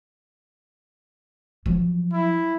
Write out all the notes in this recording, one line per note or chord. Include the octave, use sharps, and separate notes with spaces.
F3 F#3
E4